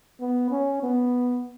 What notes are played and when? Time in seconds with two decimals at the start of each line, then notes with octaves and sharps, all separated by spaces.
0.21 B3
0.51 C#4
0.83 B3